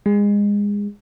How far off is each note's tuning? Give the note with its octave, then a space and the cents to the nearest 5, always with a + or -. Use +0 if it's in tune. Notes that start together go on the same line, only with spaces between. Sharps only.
G#3 -25